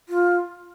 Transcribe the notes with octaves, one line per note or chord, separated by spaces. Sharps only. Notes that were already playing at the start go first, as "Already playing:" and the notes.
F4